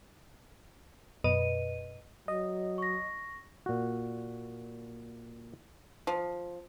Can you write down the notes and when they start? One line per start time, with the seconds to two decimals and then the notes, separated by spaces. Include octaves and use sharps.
1.24 F#2 B2 B4 D#5 D#7
2.28 F#3 D#5
2.78 C#6 A#6
3.66 A#2 F#4
6.07 F3